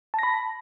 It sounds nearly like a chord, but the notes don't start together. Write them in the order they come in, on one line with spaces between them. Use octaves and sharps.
A5 A#6 B5